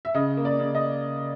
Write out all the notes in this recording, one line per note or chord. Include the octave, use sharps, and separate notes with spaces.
E5
C#3 D#5
A#3
D5
C#3
D#5